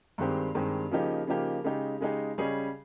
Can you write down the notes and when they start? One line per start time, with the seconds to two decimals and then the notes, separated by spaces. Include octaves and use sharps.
0.18 G2 D#3 G#3 C4 G4
0.55 G2 D#3 G#3 C4 G4
0.91 C#3 F3 A#3 D#4 G4
1.27 C#3 F3 A#3 D#4 G4
1.64 C#3 G#3 D#4 G4
2.00 C#3 G#3 D#4 G4
2.38 C#3 G3 C#4 G#4 D#5